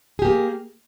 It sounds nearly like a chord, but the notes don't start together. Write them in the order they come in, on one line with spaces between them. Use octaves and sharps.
G#4 G4 A#3